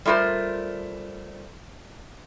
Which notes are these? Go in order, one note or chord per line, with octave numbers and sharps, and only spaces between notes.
G3 A3 F4 A#4 C5